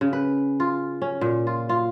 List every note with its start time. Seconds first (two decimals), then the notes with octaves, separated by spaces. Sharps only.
0.01 C#3
0.13 B4
0.60 F4
1.02 C#4
1.21 A#2
1.47 F4
1.69 F4